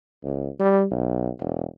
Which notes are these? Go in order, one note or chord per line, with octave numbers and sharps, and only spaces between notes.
C#2
G3
B1
E1